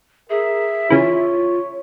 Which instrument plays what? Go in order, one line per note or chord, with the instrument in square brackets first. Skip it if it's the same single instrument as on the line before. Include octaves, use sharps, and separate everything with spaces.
[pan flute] G#4 [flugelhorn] A#4 [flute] E5
[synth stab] C#3 E3 [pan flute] F4 [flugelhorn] C#5